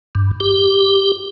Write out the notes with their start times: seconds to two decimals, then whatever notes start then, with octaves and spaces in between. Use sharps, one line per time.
0.15 G2
0.40 G4